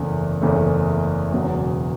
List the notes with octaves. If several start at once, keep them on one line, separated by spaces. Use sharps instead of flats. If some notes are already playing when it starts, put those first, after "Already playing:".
Already playing: F#1 E2 C#3 A3
F#1 E2 C#3 A3
E1 E2 C#3 F#3